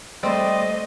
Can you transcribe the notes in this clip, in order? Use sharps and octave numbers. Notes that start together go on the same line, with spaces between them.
G3 A3 C4 C5 D#5